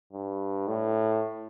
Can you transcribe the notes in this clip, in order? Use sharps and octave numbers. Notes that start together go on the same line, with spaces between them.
G2
A2